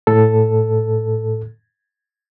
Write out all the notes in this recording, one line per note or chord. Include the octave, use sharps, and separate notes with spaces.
A2 A4